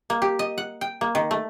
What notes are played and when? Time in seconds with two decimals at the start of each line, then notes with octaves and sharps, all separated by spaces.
0.10 A#3
0.22 G4
0.39 D#5
0.58 F#5
0.81 G5
1.01 A#3
1.15 D#3
1.31 A3